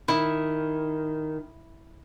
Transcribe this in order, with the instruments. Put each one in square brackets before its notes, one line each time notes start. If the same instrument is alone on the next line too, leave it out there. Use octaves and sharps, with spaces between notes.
[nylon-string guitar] D#3 [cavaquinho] E4